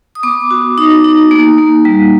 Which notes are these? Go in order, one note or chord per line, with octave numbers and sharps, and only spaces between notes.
D#6
B3 D6
F#4
D#4 D#6
D#4
A#3
A#3
G3